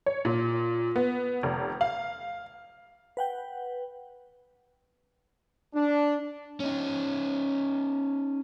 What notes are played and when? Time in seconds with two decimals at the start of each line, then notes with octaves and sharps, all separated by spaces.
0.06 C#5
0.25 A#2
0.96 B3
1.43 F1
1.81 F5
3.17 B4 F#5 G5
5.74 D4
6.60 C#4 D#4